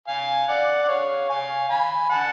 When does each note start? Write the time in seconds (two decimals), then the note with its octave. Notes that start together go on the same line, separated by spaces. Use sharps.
0.08 F5 G#5
0.48 D5 F#5
0.83 F#5
0.88 C#5 F5
1.30 F5 G#5
1.69 G#5 B5
2.10 F#5 A5